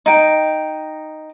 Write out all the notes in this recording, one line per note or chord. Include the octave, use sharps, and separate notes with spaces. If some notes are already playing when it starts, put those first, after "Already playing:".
D#4 G5